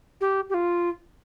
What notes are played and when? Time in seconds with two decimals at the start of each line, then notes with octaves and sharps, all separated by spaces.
0.21 G4
0.50 G4
0.54 F4